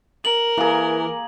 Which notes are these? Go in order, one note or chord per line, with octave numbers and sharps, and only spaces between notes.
A#4 F#7
E3 A#3 G#4